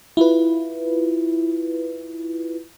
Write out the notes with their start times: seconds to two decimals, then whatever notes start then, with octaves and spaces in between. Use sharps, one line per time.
0.17 E4 F4 B4